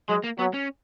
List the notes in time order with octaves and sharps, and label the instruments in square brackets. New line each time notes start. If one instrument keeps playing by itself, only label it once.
[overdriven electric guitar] F#3 [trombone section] G#3
[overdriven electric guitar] A#3
[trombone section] F#3 [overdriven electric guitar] B3
[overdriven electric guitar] C#4